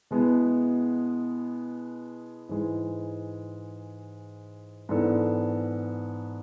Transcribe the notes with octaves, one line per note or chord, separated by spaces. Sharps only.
B2 G#3 B3 E4
G#2 E3 G#3
G#2 E3 B3 D4 A4